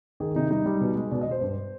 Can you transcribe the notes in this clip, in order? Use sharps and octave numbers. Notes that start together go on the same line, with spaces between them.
D#3 G#4
C3 D#4
G3 D#4
G3
B2
G#3
B2 D5
D#5
B2
C5
G2